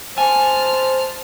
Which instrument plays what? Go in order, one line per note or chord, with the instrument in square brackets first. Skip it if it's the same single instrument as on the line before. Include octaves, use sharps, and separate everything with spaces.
[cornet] C5 [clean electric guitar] G#5 [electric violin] A5 F6